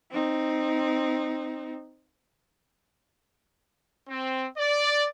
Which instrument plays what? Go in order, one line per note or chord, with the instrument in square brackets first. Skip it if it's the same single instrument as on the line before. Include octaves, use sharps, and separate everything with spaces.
[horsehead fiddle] C4 D#4
[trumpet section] C4
D5